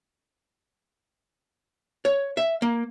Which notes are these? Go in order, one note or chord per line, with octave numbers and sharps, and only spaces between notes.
C#5
E5
A#3